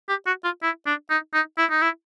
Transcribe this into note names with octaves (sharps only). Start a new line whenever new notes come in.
G4
F#4
F4
E4
D4
D#4
D#4
E4
D#4
E4